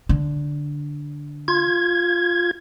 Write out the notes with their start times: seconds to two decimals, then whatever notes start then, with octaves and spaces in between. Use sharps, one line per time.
0.09 D3
1.48 F4 G#6